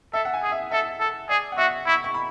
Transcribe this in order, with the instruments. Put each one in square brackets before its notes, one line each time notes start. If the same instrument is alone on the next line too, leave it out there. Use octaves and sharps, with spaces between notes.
[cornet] A4 [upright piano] E5
[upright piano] F#5
G#5
[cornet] G#4
[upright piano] E5
[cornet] A4 [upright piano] E5
[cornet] A4
[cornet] G#4 [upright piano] D5
[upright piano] F#5
[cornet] F#4 [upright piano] E5
[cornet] E4 [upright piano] C#6
[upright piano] C#6
B5